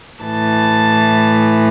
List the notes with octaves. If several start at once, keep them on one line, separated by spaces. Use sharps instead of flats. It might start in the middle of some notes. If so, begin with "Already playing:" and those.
A2 E3 A5